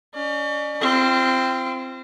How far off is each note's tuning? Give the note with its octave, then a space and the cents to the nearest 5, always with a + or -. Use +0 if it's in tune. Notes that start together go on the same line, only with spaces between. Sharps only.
C#4 +30 D5 +40
C4 +0 F4 -30